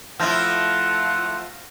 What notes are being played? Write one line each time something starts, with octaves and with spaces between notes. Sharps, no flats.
F3 A3 E4 F4 F#5 F6 G6 A#6